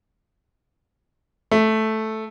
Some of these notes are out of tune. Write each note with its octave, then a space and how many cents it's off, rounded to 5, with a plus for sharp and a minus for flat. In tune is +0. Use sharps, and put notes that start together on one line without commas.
A3 -5